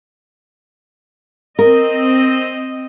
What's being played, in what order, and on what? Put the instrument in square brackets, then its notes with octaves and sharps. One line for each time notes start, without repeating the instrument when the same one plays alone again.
[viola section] C4 D#5 [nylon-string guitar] A#4